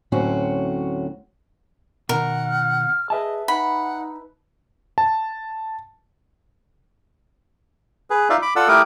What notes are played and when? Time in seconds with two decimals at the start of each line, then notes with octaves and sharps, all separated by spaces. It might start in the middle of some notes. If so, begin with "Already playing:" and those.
0.12 D2 A2 F#3 C4 C#4 F#4
2.09 B2 D#3 A#4 F#5
2.47 F6
3.10 G#4 B4 D#5 E5 A5
3.48 D#4 F#5 B5
4.98 A5
8.10 G#4 B4
8.30 D#4 F4 D5 E5 F5
8.42 B5 D6
8.56 F4 A4 D5 F#5 E6
8.68 A3 E4 G4 A#4 D6 D#6